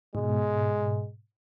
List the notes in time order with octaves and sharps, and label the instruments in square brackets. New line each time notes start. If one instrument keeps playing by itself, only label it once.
[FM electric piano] G#2 B2 [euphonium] G#3